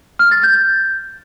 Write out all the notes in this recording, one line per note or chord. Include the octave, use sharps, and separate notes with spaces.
F6
A6
G6